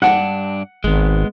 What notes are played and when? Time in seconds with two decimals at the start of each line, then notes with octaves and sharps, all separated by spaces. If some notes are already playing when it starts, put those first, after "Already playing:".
0.02 G2 D4 F#5
0.84 G#1 G#3 B3